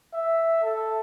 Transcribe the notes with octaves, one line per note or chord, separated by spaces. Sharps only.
E5
A4